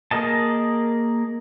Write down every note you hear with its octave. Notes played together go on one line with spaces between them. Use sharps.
A#3 G#4 A#4 D#5 A5